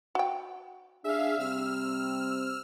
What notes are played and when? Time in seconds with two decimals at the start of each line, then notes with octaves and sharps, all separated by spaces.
0.15 F#4 G5
1.04 D4 G#4 E5 F5
1.39 C3 G3 C4 E6 F6